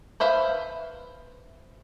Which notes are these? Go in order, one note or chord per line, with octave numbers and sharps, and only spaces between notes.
B4 C5 E5 F5